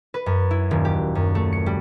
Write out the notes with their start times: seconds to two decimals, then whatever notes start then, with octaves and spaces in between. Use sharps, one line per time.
0.14 B4
0.26 F#2
0.51 E4
0.71 D#1
0.85 G4
1.15 F#2
1.35 A3
1.52 C#7
1.66 G3